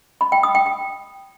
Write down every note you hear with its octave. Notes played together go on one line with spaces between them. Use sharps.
B5
G5
D#6
G5
G5